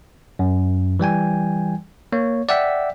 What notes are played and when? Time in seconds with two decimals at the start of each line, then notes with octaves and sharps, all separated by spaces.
0.39 F#2
0.99 E3 G3 G5 G#5
2.12 A#3 C#5
2.49 D5 E5 F#5 G5 E6 B6